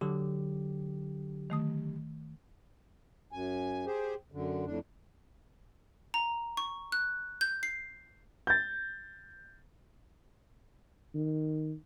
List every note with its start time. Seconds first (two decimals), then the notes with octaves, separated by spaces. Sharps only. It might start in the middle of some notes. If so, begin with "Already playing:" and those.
0.01 D3 F#3 G4
1.50 D#3 A3 D#6
3.32 F#2 G#5
3.86 G4 G#4 C5
4.32 F#2 D3
4.66 F2 A2 D4
6.14 A#5
6.57 C#6
6.92 F#6
7.41 G6
7.63 C7
8.47 G6 A6
11.14 D#3